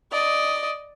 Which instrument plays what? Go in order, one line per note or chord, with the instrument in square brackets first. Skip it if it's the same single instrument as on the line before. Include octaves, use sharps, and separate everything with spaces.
[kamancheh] D5 D#5